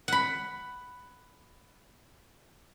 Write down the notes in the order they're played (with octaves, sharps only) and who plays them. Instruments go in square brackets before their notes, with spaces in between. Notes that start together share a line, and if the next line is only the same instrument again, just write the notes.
[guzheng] F#5 B5